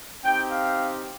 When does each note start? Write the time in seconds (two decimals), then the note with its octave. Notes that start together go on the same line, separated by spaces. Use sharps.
0.23 C4 D#4 G4 G5
0.51 F5